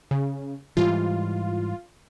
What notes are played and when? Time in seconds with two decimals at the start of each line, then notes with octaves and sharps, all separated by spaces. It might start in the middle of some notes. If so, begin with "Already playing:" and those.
0.11 C#3
0.77 G#2 E3 G3 F4